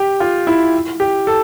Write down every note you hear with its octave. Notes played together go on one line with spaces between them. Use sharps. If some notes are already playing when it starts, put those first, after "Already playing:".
Already playing: G4
F4
E4
G4
A4